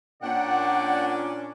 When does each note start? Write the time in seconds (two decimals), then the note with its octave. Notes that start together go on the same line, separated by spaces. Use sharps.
0.22 A#2 C#4 D4 D5 F#5 G5 F#6